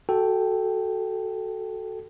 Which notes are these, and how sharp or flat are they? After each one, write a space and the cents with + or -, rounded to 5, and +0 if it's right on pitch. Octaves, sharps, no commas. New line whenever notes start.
F#4 +10 A4 -5 G5 +0